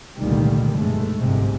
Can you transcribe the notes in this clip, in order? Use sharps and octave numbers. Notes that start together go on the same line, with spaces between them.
F1 C#2 A#2 D3 D#3 G3
B1 G2 G#3 A3
G1 C2 G#2 C3